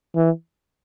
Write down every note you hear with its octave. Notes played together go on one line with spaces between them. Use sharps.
E3